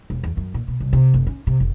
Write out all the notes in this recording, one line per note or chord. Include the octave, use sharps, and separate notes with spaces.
E1
E2
F#2
A#2
B2
C2
C3
F#1
C#4
C3
F1